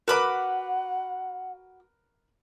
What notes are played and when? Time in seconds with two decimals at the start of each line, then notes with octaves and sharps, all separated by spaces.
0.08 F#4 A#4 B4 F#5 B5 D6